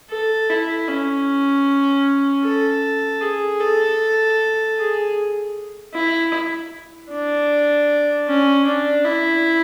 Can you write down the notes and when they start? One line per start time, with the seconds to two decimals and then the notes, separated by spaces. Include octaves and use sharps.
0.11 A4
0.50 E4
0.88 C#4
2.44 A4
3.21 G#4
3.61 A4
4.77 G#4
5.94 E4
7.11 D4
8.28 C#4
8.66 D4
9.05 E4